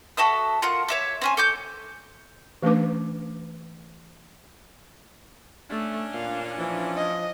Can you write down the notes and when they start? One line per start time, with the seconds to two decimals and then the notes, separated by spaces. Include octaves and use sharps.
0.17 F#4 A4 E5 D#6
0.62 F4 A#4 F#5
0.88 C#5 E5 D6
1.22 C4 C#4 G#5
1.37 A4 D6 G6
2.63 E3 A3 C#4 D4 B4 D6
5.70 A3 C#4 D4
6.14 A#2 F5
6.58 E3 F3
6.97 D#5